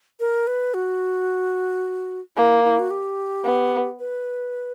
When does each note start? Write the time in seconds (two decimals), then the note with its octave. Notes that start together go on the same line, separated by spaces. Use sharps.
0.20 A#4
0.47 B4
0.74 F#4
2.36 A#3 E4
2.64 E4
2.79 F#4
2.91 G4
3.44 B3
3.99 B4